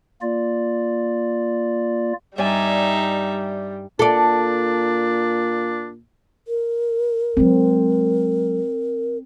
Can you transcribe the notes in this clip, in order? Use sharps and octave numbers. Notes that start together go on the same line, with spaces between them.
A#3 F4 D5
G2 G3 D#4 D5 E5 G#5
A#2 D4 A4 D5
A#4
F#3 G#3 C4